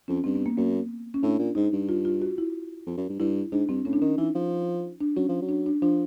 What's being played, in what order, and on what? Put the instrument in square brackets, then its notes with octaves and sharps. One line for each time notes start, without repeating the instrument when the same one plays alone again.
[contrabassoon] F2 [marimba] C#4
[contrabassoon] G2 [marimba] C4
[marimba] B3
A#3
[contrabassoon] F#2 [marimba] A#3
[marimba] C#4
[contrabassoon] A2 [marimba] D4
[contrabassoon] A#2
[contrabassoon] G#2 [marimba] D#4
[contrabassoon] G2
[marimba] F4
F4
F#4
E4
[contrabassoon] F2
F#2
G2
[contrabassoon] G2 [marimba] E4
[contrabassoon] G#2 [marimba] D4
[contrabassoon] G2 [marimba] C4
[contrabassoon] A2 [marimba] C#4
[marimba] D4
[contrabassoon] D#3 [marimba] C#4
[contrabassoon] E3 [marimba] D#4
[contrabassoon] F3
[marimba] D4
[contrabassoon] F#3 [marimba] C#4
[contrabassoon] F3
F#3
[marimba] D4
D4
[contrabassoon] F3 [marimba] D4